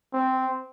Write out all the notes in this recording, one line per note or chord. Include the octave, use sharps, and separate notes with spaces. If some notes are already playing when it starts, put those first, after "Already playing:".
C4